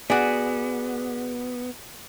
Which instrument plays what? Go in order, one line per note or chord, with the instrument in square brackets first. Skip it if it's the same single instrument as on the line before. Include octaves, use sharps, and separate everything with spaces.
[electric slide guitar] B3 [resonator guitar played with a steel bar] F#4 D5 [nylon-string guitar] G#4